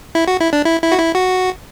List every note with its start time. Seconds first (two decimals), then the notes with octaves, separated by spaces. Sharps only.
0.15 E4
0.28 F#4
0.40 E4
0.53 D4
0.65 E4
0.82 E4
0.92 F#4
0.99 E4
1.15 F#4